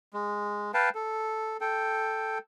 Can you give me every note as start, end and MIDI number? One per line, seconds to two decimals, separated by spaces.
0.14 0.72 56
0.74 0.89 71
0.74 0.89 77
0.74 0.89 79
0.74 0.89 81
0.95 1.57 69
1.61 2.38 69
1.61 2.38 79